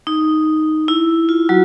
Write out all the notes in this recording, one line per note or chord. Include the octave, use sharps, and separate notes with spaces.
D#4
E4
F4
F#3 F#4